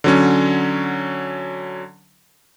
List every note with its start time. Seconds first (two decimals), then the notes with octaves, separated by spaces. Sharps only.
0.04 D3 F#3 C#4